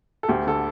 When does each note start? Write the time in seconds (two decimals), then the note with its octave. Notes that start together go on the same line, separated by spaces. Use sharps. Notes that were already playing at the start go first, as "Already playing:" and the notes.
0.23 A4
0.28 D2 G4
0.47 D3 A4